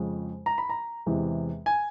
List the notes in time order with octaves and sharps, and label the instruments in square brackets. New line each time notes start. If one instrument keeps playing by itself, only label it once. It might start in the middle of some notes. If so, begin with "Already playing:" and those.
Already playing: [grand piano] F2 C#3 F3 G#3
A#5
B5
A#5
E2 C3 E3 G#3
G#5